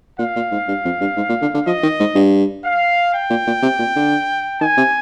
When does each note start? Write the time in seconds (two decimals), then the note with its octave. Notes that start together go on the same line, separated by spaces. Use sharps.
0.19 A#2 F5
0.36 A#2
0.52 G#2
0.68 G2
0.85 F2
1.01 G2
1.17 G#2
1.29 A#2
1.41 D3
1.54 D3
1.66 F3 D#5
1.83 D#3
2.00 G#2
2.15 G2
2.64 F5
3.13 G5
3.30 A#2
3.47 A#2
3.62 C3
3.79 A#2
3.96 D3
4.61 D#3 G#5
4.77 C3